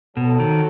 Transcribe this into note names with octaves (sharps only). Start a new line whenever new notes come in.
B2 F#3 C4 F#4 A4
D#3